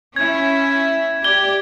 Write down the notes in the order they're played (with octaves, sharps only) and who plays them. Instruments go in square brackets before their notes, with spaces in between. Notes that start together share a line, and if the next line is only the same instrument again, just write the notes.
[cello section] C#4 E4 [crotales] G#6
[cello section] G4 D5 [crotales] G#6 G7